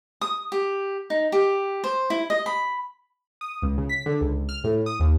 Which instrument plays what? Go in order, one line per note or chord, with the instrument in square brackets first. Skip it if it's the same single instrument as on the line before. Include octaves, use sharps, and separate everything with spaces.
[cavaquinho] D#6
G4
D#4
G4
C5
E4
D#5
B5
[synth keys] D#6
C#2
C#3
B6
D3
C#2
F6
A2
D#6
D#2